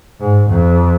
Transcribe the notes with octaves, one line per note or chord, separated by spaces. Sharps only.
G#2
F2